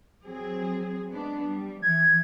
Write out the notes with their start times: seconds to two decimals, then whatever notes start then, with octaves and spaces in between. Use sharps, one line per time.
0.25 F#3 C4 G#4
1.11 G#3 B3 D4
1.45 G3
1.82 E3 G#6